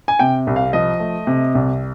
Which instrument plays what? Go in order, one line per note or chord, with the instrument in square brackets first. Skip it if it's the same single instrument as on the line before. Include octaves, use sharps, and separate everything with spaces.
[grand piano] G#5
C3 G5
C2
F5
F3 D#5
A3
C3
C2